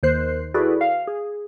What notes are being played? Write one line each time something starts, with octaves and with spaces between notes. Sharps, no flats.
D#2 D#3 C5 F#6 C7
E4 F#4 G#4 A4 B4 D5
F5
G#4